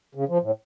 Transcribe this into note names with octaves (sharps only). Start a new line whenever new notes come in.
C#3
F3
A2